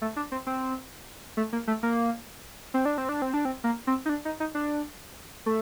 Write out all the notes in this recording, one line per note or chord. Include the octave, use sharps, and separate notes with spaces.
A3
D4
C4
C4
A3
A#3
A3
A#3
C4
D4
C4
D4
C4
D4
C4
A#3
C4
D#4
D4
D#4
D#4
D4
A3